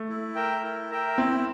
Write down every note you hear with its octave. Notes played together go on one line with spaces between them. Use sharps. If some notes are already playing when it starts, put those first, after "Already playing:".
Already playing: A3
E4
A#4 E5 G5
E4
A#4 E5 G5
C4 E4